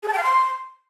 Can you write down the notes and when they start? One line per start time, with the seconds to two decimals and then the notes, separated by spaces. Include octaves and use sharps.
0.03 G#4
0.08 A5
0.13 G5
0.18 F5
0.23 C6